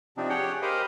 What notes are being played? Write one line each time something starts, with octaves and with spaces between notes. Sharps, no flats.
C3 F3 C4 D4 D#4
G4 G#4 C#5 F#5 G5
G4 A#4 C5 D#5 F5 B5